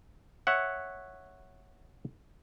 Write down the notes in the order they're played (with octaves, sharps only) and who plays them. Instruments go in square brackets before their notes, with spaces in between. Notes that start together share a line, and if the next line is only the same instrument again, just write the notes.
[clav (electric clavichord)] C#5 E5 F#5